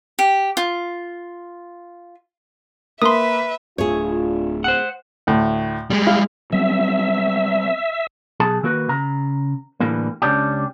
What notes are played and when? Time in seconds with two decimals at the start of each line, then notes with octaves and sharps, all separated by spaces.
0.19 G4
0.57 F4
3.02 A#3 B4 E5 C6 D#6
3.78 D1 A3 D4 F4 G#4 C#5
4.64 C5 F#5
5.27 D2 A2
5.90 G3 G#3
6.07 E4 F5
6.52 F#3 G3 C4 E5
8.40 B1 G#4 A5
8.63 D#3 A#3 F#4 B4
8.89 C#3 A#5
9.80 A2 D3 E3 G3 A#3
10.22 C#2 C#4 D4 G4